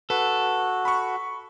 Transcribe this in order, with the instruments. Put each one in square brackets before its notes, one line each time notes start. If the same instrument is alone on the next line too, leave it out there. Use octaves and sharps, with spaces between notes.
[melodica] F#4 [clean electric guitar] A4 [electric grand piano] B4
[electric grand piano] B5 C#6